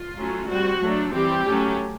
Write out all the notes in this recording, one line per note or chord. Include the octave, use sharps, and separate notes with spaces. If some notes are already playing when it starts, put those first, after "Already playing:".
Already playing: F4
F#3 A3 C#4
G3 C4 F#4
F#3 A3 D4
E3 G3 C4 G4
F#3 A3 C#4